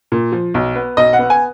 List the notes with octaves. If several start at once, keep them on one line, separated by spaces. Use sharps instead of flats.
A#2
F3
B1
B3
B1 D#5
F#5
B3
G#5